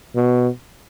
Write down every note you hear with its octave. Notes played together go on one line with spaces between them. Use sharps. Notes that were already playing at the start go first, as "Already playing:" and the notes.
B2